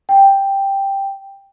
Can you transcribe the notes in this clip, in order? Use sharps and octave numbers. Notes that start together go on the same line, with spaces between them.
G5